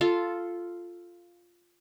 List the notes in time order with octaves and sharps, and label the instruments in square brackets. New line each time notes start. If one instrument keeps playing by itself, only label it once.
[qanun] F4 A4